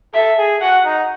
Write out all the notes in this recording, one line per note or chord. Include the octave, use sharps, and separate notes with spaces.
A4 E5
G#4
F#4 F#5
D#4